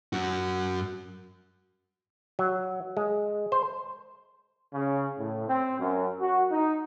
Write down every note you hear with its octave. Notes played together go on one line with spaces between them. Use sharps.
F#2 F#4
F#3
G#3
C5
C#3
A2
C4
F#2
F#4
D#4